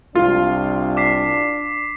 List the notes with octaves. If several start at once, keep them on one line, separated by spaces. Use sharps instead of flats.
C2 D4 F4
D6 B6 C7